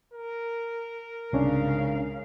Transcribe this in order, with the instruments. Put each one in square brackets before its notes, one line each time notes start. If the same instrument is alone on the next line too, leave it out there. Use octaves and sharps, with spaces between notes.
[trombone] A#4
[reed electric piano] C2 C#4 D4 [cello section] G#2 C#3 F5